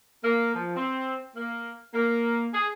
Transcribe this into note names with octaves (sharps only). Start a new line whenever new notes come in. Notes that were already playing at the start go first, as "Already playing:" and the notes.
A#3
F3
C4
A#3
A#3
G#4